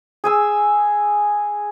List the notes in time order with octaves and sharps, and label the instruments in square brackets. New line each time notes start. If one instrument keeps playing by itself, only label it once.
[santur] G#4 G#5 E6